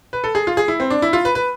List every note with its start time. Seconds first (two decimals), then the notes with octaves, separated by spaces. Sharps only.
0.13 B4
0.24 A4
0.35 G#4
0.47 F4
0.57 G#4
0.68 E4
0.80 C4
0.90 D4
1.02 E4
1.13 F4
1.25 B4
1.35 B4